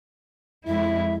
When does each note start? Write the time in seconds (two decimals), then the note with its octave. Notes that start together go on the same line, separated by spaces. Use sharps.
0.67 F2 G#3 E4 E5